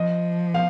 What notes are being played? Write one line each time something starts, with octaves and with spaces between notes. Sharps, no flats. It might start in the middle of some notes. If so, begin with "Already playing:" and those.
Already playing: F3 D#5
F5